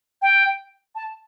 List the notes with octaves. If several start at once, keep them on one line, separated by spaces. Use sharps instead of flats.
G5
A5